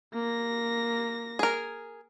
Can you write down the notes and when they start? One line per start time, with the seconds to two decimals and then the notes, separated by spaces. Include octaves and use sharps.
0.13 A#3 A#6
1.39 G#4 A#4